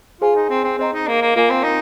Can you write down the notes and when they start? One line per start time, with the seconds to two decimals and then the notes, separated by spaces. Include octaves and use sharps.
0.21 F4 G#4 C5 G#5 C6
0.35 D#4
0.49 C4
0.64 C4
0.79 C4 C5 D#5 A#5
0.93 D#4
1.07 A#3
1.22 A#3
1.36 A#3 F4 A#4 F5 G#5
1.50 C4
1.64 D#4